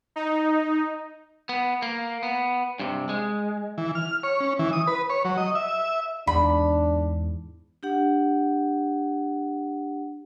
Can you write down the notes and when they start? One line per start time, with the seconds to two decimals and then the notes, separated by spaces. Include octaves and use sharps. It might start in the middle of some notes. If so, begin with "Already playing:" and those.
0.16 D#4
1.49 B3
1.82 A#3
2.23 B3
2.80 G2 C3
3.09 G#3
3.78 E3
3.95 F6
4.23 C#5
4.40 C#4
4.59 E3
4.73 D#6
4.87 B4
5.10 C#5
5.25 F#3
5.37 D#5
5.55 E5
6.27 E2 G#2 D4 B5
7.83 D4 G4 F#5